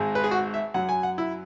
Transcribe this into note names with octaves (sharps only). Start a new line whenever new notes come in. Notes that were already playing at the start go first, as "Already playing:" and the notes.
Already playing: G#1 G#2 G#3
B4
G#4
F#4
E5
F#2 F#3 F#5
G#5
F#5
E4